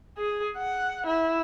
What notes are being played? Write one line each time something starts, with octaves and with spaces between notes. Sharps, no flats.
G#4
F#5
E4